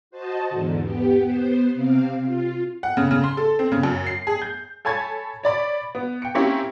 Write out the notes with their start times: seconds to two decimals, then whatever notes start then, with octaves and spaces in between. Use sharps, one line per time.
0.11 F#4 C5 D#5 A5
0.50 E2 G#2 D3
0.79 B3 G4
1.21 B3 C5
1.75 C3 C4 F5
2.25 F4
2.83 F#5
2.97 C#3
3.11 C#3
3.24 C6
3.37 A4
3.59 C4
3.72 C#3
3.83 F#2
4.06 C7
4.27 G#4
4.42 G6
4.85 A4 C#5 G#5 B5 G#6 A6
5.43 C#5 D5 B5
5.95 B3
6.22 G5 C#7
6.35 A#3 C4 C#4 E4 G4